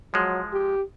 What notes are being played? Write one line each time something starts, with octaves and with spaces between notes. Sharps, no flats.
F3 F#3 G#3
G4